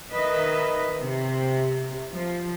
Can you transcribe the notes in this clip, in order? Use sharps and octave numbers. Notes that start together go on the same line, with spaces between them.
D#3 B4 D#5 E5
C3
F3